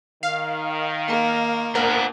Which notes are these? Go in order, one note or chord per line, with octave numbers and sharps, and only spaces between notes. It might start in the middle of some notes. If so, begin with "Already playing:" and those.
D#3 F5
A#3
A#2 B3 D4 A#4 C5 F#5